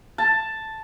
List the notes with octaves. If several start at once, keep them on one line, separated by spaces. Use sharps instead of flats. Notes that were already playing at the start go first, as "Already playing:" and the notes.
A5